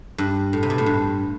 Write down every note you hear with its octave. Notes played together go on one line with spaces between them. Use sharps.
G2
A2
C3
B2
A2
G2